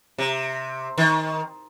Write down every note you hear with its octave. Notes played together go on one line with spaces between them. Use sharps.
C3
D#3